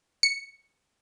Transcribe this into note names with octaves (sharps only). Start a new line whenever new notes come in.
C#7